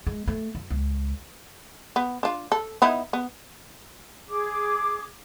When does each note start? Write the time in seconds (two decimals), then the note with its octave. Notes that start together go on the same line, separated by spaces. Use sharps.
0.06 G#3
0.27 A3
0.55 F#2
0.70 C#2
1.96 B3
2.23 D4 F4
2.52 A4
2.82 B3 D#4 E4
3.13 B3
4.27 G#4 D6